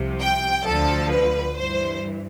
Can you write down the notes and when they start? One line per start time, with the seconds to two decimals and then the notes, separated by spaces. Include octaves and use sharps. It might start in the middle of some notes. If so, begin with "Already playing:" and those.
Already playing: C2 C3 F3
0.20 G5
0.65 D2 D3 F3 A4
1.11 B4
1.57 G2 E3 C5